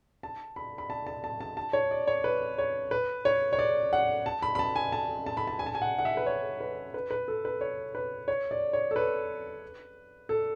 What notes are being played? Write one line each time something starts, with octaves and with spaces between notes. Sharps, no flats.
A5
B5
B5
A5
A5
A5
A5
A5
C#5
D5
C#5
B4
C#5
B4
C#5
C#5
D5
F#5
A5
B5
B5
A5
G#5
A5
A5
B5
A5
G#5
A5
G#5
F#5
F#5
E5
B4
C#5
B4
B4
B4
A4
B4
C#5
B4
C#5
D5
C#5
A4
B4
A4